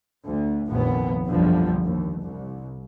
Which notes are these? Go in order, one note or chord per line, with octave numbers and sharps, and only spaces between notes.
D2
F1 A#1 D#2 B3
F#1 B1 E2 D3 F3 G3
D#2
C2